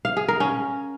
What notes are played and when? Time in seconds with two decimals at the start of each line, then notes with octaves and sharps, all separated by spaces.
0.05 F5
0.17 G#4
0.28 A#4
0.40 C#4